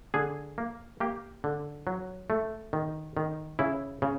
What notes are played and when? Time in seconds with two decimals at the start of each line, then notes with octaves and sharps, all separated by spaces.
0.14 D3 G#4
0.58 A#3
1.00 A#3 G4
1.44 D3
1.87 F#3
2.30 A3
2.73 D#3
3.17 D#3
3.59 C#3 E4
4.02 C#3